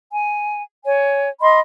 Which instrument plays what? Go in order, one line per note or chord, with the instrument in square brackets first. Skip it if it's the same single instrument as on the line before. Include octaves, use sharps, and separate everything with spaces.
[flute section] G#5
C#5 G#5
D#5 B5 C6